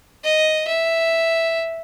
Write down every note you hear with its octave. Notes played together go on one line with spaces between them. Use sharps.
D#5
E5